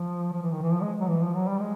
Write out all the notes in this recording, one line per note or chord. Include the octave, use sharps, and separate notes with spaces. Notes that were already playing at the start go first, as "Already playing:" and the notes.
Already playing: F3
F3
E3
D#3
E3
F3
G#3
F#3
E3
F3
F#3
G3
G#3